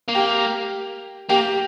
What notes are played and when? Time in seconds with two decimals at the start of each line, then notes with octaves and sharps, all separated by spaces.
0.08 A#3
0.15 G4
1.29 A#3 G4